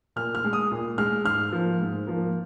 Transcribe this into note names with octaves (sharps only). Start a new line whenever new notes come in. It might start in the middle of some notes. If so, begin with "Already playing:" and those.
A#2 F6
F6
G#3
D#6
A#2
G#3 F6
G#2 F6
F3 A#3
G#2
F3 A#3